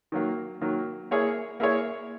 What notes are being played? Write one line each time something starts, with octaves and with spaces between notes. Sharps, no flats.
D#3 F#3 A#3
D#3 F#3 A#3
A#3 E4 G#4 C#5
A#3 E4 G#4 C#5